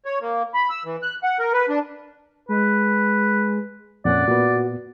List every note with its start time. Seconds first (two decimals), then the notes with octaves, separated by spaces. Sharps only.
0.05 C#5
0.21 A#3
0.54 B5
0.70 E6
0.85 E3
1.03 F#6
1.23 F#5
1.39 A#4
1.53 B4
1.69 D4
2.49 G#3 B4
4.05 F2 A#2 C#4 D5 F#5
4.28 A#2 B3 F#4